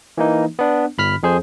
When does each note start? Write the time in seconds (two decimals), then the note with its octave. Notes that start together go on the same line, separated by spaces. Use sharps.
0.18 E3 A#3 D#4
0.59 B3 D4
0.98 G1 B5 F6 B6
1.23 F2 G#4 C5